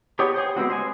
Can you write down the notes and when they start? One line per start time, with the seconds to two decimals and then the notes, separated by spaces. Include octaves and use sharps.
0.19 B3 G4 G#4 C#5 D#5
0.34 G#4 C5 G5
0.56 G#3 B3 C4 F#4
0.70 C5 D#5 G#5